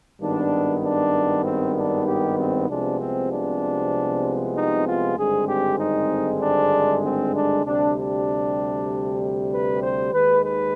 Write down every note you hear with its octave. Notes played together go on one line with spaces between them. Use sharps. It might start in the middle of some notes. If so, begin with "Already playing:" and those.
G#1 G2 D#3 B3 D4
D4
C4
D4
G4
C4
C2 C3 F3 G#3 B3 D4
C4
D4
D#4
F4
G#1 G2 D3 G#3 C4 G#4
G4
D#4
D4
C4
D4
D2 C3 G3 D4
D4
B4
C5
D#2 D#3 G#3 B4
B4